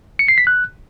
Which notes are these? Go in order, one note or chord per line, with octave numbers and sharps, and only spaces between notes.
C#7
C7
B6
F#6